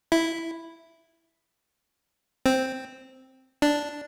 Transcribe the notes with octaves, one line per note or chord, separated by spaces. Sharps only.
E4
C4
D4